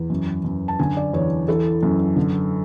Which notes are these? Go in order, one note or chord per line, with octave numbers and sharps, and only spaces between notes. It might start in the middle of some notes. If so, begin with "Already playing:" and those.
Already playing: E2
F#2
F#2
A5
D3 G#5
D5
E2 C#5
E3 A4
F#2
D3